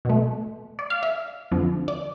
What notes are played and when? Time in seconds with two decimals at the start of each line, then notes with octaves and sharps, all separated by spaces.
0.05 B2 A3
0.79 D5
0.90 F5
1.03 E5
1.51 F2 D3 F3
1.88 D5